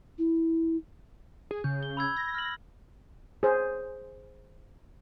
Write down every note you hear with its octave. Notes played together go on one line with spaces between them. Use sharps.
E4
G#4
C#3 G6
G7
B5 E6 G#6
A#6
F6 F#7
G#4 C5